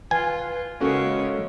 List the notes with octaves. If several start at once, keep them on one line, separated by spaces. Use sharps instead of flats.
F4 B4 G#5
C#3 G#3 A#3 C#4 F#4 A4 C#5